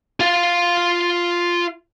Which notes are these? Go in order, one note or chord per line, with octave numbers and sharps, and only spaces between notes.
F4 F5